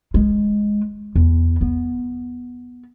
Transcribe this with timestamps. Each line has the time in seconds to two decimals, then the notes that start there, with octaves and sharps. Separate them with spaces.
0.14 G#3
1.16 E2
1.61 B3